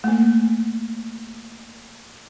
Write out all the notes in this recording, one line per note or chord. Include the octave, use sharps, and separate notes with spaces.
A3 A#3